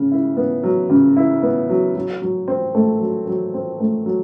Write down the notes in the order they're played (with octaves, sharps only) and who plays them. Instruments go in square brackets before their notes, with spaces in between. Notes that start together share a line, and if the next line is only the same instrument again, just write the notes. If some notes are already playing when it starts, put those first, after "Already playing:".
Already playing: [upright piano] C#3
E4
B3
F#3
C#3
E4
B3
F#3
F#3
F#3
C4
A3
F#3
F#3
C4
A3
F#3